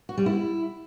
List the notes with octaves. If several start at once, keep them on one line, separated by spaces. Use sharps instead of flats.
F#4
G3
E4